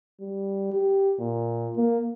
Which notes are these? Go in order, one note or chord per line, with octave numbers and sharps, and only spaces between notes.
G3
G4
A#2
A#3